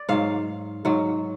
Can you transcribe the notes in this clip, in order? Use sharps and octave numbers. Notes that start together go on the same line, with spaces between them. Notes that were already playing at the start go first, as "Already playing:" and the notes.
Already playing: D5
G#2 F#3 F5
G#2 F#3